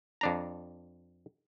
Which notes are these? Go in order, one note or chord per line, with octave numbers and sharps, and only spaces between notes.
F2 D4 A#5